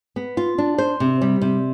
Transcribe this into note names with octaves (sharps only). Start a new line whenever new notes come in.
B3
F4
D4
C5
C3
G3
C3